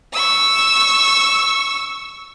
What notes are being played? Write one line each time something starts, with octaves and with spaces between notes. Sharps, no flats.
C#6 E6